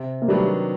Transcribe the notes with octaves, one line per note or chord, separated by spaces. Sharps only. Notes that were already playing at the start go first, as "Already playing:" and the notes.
Already playing: C3
A#3
D#3 F#3 G3 A3 B3 D4